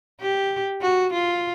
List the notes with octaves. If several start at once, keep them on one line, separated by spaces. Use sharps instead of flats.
G4
F#4
F4